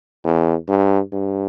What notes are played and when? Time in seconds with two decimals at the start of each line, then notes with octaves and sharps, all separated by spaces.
0.24 E2
0.69 G2
1.13 G2